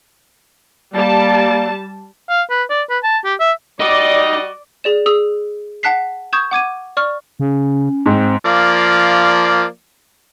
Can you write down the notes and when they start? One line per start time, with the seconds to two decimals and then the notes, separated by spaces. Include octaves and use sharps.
0.94 G3 A#3 D5 A5
2.29 F5
2.50 B4
2.70 D5
2.90 B4
3.03 A5
3.25 G4
3.40 E5
3.80 G3 D#4 F#4 D5 D#5
4.84 G#4 D5 E7
5.06 G#4 D#6 E6
5.83 F#5 A5 F#6 B6 C7
6.33 C#6 D#6 G6 G#6 E7
6.51 F#5 D6 G#6 D#7
6.97 D5 C#6 F6
7.40 C#3 C#4
8.06 G#2 C4
8.45 F3 A#3 D5